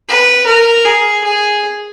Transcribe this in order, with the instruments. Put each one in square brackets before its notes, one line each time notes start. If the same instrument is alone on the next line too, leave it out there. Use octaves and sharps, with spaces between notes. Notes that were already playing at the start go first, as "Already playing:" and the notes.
[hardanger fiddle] B4
A#4
G#4
G#4